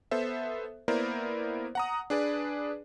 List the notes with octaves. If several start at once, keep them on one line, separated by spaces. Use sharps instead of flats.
B3 A4 C5 E5
A#3 B3 E4 A#4 C5 D5
F#5 A#5 D#6
D4 G#4 B4 D5